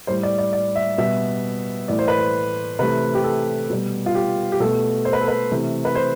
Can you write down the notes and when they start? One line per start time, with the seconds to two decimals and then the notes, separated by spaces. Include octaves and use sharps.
0.07 A2 G3 C5
0.23 D5
0.39 D5
0.53 D5
0.76 E5
0.98 B2 G3 E5
1.88 A2 E3 A3 D5
1.99 C5
2.08 B4
2.18 C5
2.79 C3 E3 A3 B4
3.15 G4
3.24 A4
3.70 B2 G3
4.06 F4
4.15 G4
4.52 G4
4.60 B2 A3 A4
5.05 C5
5.13 B4
5.21 A4
5.28 B4
5.51 C3 E3 A3
5.85 B4
5.95 C5